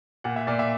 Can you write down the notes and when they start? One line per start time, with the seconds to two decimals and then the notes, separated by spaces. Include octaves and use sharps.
0.24 A#2 F#5
0.36 E5
0.47 A#2 D5
0.59 E5